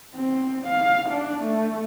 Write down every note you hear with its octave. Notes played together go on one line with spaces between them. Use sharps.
C4
F5
D4
A3